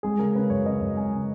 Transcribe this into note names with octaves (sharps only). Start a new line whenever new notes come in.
G#3 G#4
C#3 A#4
C#3 B4
F#2 C#5
C#3 D#5
F#2
G#3 G#5
C#3